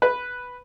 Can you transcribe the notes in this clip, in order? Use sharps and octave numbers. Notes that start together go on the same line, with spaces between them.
B4